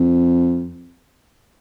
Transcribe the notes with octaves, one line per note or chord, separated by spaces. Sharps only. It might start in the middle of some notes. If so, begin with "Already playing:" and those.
Already playing: F2